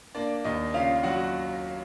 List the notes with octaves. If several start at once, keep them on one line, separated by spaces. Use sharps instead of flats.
A#3 D4 D5
D#2 D#4 D#5
C#3 F4 F5
F#3 F#4 F#5